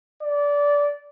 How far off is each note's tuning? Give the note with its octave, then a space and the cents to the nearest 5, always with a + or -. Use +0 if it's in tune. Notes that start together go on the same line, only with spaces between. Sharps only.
D5 -20